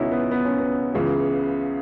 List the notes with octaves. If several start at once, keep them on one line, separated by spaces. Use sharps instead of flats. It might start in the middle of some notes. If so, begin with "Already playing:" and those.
Already playing: C#2 B2 F#3 C#4 D#4 E4 F#4
B3
B3
C#4
B3
C#2 C#3 E3